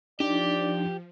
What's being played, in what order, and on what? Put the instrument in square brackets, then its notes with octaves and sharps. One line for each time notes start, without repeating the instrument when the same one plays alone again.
[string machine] F3 [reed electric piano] D4 D#4 [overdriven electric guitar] G4 [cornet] D5